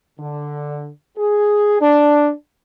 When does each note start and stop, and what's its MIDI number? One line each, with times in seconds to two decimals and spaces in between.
0.20 0.88 50
1.17 1.77 68
1.80 2.31 62